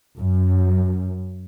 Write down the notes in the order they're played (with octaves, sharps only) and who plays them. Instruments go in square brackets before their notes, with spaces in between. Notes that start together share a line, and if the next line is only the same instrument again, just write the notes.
[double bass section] F#2